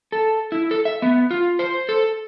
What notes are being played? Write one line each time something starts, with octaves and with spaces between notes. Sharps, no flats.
A4
E4
A4
E5
B3
F4
C5
A4